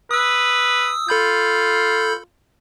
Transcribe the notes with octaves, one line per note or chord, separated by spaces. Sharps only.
B4 D#6 E6
F4 A4 B5 G6